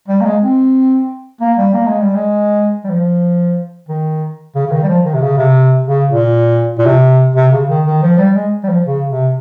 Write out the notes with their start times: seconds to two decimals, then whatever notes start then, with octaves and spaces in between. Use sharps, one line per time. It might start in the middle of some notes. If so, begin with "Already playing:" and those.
0.08 G3
0.21 A#3
0.25 G#3
0.42 C4
1.41 A#3
1.58 G3
1.74 A#3
1.87 G#3
2.01 G3
2.15 G#3
2.84 G3
2.89 F3
3.89 D#3
4.55 C#3
4.66 C#3
4.72 D#3
4.83 G3
4.88 F3
5.05 D#3
5.14 C3
5.22 C#3
5.37 C3
5.87 C#3
6.12 A#2
6.78 A#2
6.86 C3
7.36 C3
7.52 C#3
7.69 D#3
7.86 D#3
8.02 F3
8.18 G3
8.35 G#3
8.63 G3
8.68 F3
8.85 C#3
9.10 C3